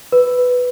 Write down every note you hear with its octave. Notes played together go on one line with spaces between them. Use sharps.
B4